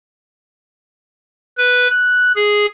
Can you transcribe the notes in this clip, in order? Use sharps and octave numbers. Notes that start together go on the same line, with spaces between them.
B4
F#6
G#4